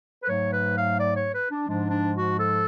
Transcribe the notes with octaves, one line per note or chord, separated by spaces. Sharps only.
B4
G#2 F#3 A3 C#5
B4
F5
D5
C#5
B4
D4
G#2 F3 G#3 D4
D4
F#4
A4